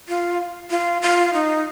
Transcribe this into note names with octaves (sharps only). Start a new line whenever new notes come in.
F4
F4
F4
D#4